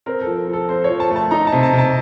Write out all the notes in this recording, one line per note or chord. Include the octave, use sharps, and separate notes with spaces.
C4 A#4
A4
F3
F3
A4
C4 C5
C#5
F3
A5
A3
A5
D#4 A#5
A5
C3
A5
C3 A5